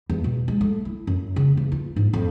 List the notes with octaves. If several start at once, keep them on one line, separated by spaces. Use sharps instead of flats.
E2
B2
G#3
A3
E4
F#2
C#3
E2
F4
G#2
F2